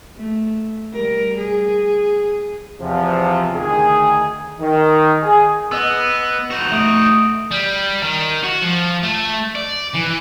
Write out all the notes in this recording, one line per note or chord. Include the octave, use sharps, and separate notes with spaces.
A3
G3 A#4
G#4
E2 C3 F3
D2 D#3 G#4
D#3
G#4
B3 D#5 E6
D#4 F#4
A3 D#6 D7
G3
D#3
F#4
F3
A3
D5
E3